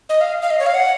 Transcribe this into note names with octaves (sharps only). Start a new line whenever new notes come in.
D#5
F5
F5
D#5
C#5
F5
F#5